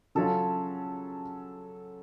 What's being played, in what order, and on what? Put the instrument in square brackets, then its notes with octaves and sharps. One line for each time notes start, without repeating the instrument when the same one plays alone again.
[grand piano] C#3 F#3 C#4 F4 [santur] A4